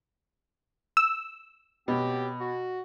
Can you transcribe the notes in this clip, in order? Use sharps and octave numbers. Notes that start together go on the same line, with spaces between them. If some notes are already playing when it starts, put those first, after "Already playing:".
E6
B2 F#3 C4 G4
F#4